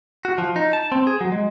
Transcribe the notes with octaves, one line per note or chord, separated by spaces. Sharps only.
F#4
F3
D#4
A5
C4
G#4
F#3
G#3